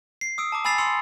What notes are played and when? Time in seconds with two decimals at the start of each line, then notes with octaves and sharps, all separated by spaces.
0.21 C7
0.38 D#6 E6 D7
0.52 A5 A#5 D6
0.65 G#5 B5 E6 A6 C7 F7
0.78 C6 E6 C#7 F7